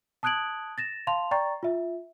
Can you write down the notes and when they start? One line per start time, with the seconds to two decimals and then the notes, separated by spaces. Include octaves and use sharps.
0.23 A5 D#6 F#6 G#6 D7 F#7
0.78 A6 A#6 E7
1.07 F5 A5 C6 F7
1.31 D5 G5 A#5 C#6 A6
1.63 F4 E5